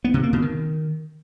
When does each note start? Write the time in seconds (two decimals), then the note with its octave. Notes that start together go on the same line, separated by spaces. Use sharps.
0.04 B3
0.14 C3
0.23 A#3
0.33 B2
0.42 D#3